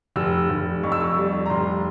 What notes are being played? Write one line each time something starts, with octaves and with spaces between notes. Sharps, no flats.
F1 E6
F1
F2 C#6
E6
C#6
G3
A#5
F1 C6